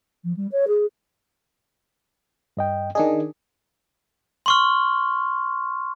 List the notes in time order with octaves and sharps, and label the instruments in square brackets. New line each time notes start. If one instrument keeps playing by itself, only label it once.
[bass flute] F3
G3
C#5
G#4
[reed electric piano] G2 D#5 G5
[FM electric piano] D#3 D4 G#4 [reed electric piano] D#5
[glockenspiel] C6 C#6 F6